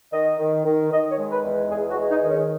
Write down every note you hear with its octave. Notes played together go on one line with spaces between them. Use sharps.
D#3 D#5
D#3
D#3
D#3 D#5
C#5
G#3
B4
E2
E2 G#4
F#4
G#3
D#4
D#3
C#4